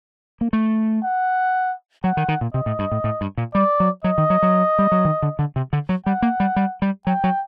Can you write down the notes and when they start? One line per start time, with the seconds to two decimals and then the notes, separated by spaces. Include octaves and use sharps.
0.41 A#3
0.53 A3
1.03 F#5
2.04 F#3 F#5
2.17 D#3
2.28 D#3
2.41 A#2
2.54 C3 D#5
2.66 A2
2.79 G2
2.92 A2
3.04 A2
3.21 G2
3.37 A#2
3.55 G3 D5
3.80 F#3
4.04 F#3 D#5
4.18 D#3
4.30 F#3
4.43 F#3
4.79 G3
4.92 F#3
5.05 D#3
5.22 D3
5.39 D3
5.56 C3
5.73 D3
5.89 F#3
6.06 G3 F#5
6.22 A#3
6.40 G3
6.56 G3
6.82 G3
7.07 F#3 G5
7.24 F#3